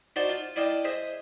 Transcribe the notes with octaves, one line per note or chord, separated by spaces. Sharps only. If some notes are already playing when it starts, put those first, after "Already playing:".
D#4 F#4 C5 D5 A5 C6
F4
E4 D5 D#5 F5 G5 A5
G#4 C5 D#5 E5